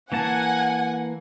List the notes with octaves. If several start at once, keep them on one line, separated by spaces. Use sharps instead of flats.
E3 A#3 F#5 G#5 A5